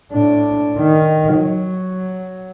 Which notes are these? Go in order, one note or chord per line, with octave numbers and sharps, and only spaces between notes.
A2 D4
D#3
F#3